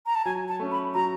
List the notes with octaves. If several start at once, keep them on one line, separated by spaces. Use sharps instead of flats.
A#5
A5
F#3 G#5
A5
A3 C#4
B5
F#3 A#5